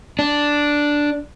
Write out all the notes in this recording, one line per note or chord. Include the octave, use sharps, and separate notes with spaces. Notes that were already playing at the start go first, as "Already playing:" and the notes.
D4